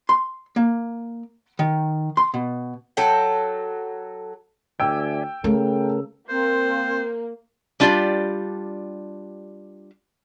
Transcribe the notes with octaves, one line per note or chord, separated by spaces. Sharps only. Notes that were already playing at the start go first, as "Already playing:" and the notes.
C6
A#3
D#3
C6
B2
F#3 A4 G5
D2 D5 E5 G5 G#5 E6
C#3 A3 A4 A#4
A#3 C4 C5
G3 D4 F4 G4 D5